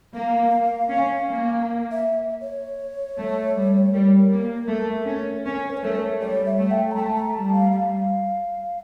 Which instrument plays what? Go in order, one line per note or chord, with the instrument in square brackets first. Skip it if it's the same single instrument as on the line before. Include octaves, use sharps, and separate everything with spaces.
[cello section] A#3 [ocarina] F5
[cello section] C#4
A#3
[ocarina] E5
C#5
[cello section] A3
G3
[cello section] G3 [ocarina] A#4
[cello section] A#3
A3
C#4
[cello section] C#4 [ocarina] C#5
[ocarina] A#4
C#5
[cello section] A3 [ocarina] A#4
[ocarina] C#5
[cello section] G3 [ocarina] C#5
[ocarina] E5
[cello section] A3
[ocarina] G5
A#5
[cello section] A3 [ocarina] A5
[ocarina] A#5
[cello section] G3 [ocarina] A5
[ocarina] F5
F5